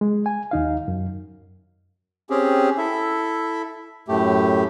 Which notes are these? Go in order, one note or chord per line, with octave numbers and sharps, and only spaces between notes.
G#3
G#5
D#2 D#4 F5
F#2
C4 C#4 G4 G#4
E4 A4 E5
F#2 A2 A3 G4